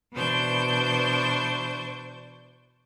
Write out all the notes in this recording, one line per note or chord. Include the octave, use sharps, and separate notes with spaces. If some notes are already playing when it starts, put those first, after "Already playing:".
B2 E3 D4 C5 C#6 G6